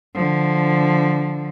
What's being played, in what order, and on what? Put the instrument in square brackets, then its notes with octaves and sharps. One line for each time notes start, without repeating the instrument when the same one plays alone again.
[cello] D3 F3